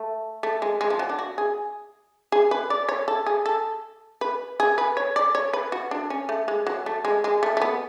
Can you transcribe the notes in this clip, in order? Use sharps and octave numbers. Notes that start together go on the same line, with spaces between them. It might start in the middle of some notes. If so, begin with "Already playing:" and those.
Already playing: A3
A3
G#3
G#3
F3
F#3
D4
F#4
G#4
G#4
B4
D5
C#5
A4
G#4
A4
B4
G#4
B4
C#5
D5
C#5
B4
F#4
D4
C#4
A3
G#3
F#3
A3
G#3
G#3
A3
A3
B3